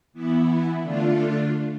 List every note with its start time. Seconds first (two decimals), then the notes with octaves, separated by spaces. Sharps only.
0.13 E3 B3 E4
0.82 D3 A3 D4 F4